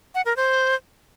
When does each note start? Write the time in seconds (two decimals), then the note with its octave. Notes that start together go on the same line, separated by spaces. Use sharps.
0.15 F#5
0.26 A#4
0.37 C5